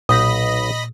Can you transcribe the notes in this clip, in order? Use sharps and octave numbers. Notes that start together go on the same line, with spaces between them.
B1 A#2 D#4 D#5 F#5 B5 D#6 A#6